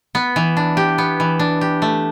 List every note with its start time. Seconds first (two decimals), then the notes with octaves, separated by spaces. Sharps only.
0.15 B3
0.36 E3
0.57 D4
0.77 G4
0.98 B3
1.20 E3
1.39 D4
1.61 G4
1.82 A3